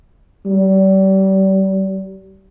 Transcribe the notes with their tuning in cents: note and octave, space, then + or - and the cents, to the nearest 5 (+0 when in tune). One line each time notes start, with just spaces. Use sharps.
G3 -35